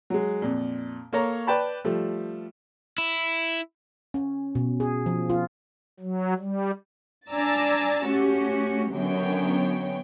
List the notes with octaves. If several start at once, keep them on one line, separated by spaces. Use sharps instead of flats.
F#3 G#3
F2 A#2
A#3 A4 C#5 A#5
B4 D5 G5 A5 B5
F3 G3 A3
E4
C#4
B2
G#4
F3
F4
F#3
G3
D4 D5 G#5 A#5 E6 A6
A3 C#4 F#4 G4
F#2 D3 F#3 B3 C#5 G5